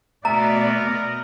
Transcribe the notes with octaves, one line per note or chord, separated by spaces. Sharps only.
B2 A3 B3 A#4 D5 E5 A#5